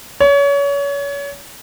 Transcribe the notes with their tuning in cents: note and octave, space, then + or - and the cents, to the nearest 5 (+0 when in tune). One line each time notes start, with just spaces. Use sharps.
C#5 +30